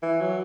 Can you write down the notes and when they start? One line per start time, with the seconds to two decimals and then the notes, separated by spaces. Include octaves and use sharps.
0.02 E3
0.21 F#3